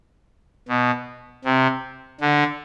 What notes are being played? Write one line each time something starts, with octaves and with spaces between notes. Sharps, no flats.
B2
C3
D3